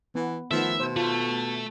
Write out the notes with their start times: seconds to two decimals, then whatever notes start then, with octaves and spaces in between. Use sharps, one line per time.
0.15 E3 B3
0.51 D#3 F3 A3 B3 E5
0.80 B2 C5
0.96 A3 F4